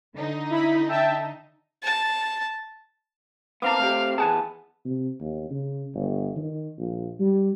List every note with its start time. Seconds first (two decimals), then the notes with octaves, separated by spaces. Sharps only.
0.15 D3 D#4
0.50 E4 B5
0.88 E5 G5 A5
1.84 A5
3.62 B3 C4 A#4 F5 A5 D6
3.79 A3 C4 G4
4.18 E3 B3 G#4 F#5 G#5 A5
4.85 C3
5.20 D#2
5.50 C#3
5.94 G1
6.37 D#3
6.78 A#1
7.20 G3